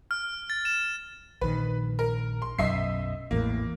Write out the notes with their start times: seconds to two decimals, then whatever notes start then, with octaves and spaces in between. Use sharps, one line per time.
0.11 F6
0.50 A6
0.65 E7
1.41 A#1 D#3 B4
1.99 A#4
2.42 C6
2.59 B1 F#2 D#5 E5 C7
3.31 A1 E2 A2 A#3